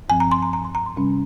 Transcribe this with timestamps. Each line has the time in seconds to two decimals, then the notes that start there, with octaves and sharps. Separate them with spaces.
0.09 G2 F3 C4 G#5
0.20 A#5
0.32 C6
0.42 A#5
0.53 A#5
0.65 C6
0.75 A#5
0.86 C6
0.97 C3 G3 C#4